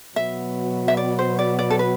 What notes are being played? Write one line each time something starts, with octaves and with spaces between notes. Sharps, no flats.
B2 F#3 B3 E5
E5
D5
C5
D5
D5
A4
B4